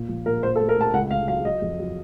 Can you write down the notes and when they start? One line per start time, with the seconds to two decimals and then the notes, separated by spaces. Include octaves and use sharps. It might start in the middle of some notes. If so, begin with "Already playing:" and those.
Already playing: A#2
0.09 F3
0.26 A#2 A#4
0.43 A#2 C5
0.55 A4
0.60 A3
0.69 A#4
0.77 A3 A5
0.93 C#2 F#5
1.11 C#2 F5
1.28 F#3 F5
1.45 F#3 D#5
1.62 F2
1.79 F#3